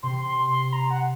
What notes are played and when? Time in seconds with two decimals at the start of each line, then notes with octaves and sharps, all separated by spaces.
0.02 C3 C6
0.25 C6
0.49 C6
0.72 A#5
0.90 F#5